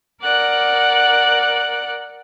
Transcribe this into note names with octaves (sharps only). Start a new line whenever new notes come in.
A#4 D5 F#5 F#6